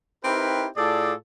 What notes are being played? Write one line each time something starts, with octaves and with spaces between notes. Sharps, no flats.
C4 D#4 E4 G4 A#4 B4
A2 F4 G#4 A4 D5